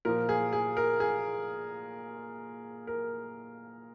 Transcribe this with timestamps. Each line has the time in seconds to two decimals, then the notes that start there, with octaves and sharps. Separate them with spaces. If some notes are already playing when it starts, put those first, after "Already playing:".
0.05 A#2 F3 A#4
0.29 G#4
0.53 G#4
0.77 A#4
1.00 G#4
2.87 A#4